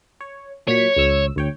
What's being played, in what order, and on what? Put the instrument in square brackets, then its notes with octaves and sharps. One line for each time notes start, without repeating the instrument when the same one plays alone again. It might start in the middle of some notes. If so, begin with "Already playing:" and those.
[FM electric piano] C#5
[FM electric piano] A#2 F#3 B6 [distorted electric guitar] C#5
[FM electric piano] C#2 E6
D2 C#5 G5